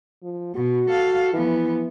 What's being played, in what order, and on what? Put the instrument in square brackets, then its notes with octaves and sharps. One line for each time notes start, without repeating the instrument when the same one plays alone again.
[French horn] F3
[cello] B2 [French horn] F#4
[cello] A4 F5
[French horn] E3 [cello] F3 B3